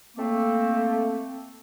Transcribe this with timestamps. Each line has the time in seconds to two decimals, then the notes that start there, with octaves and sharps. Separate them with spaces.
0.17 A3 A#3 C4